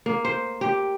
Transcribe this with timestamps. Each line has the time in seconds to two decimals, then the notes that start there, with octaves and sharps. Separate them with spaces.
0.06 A#3
0.25 C5
0.61 G4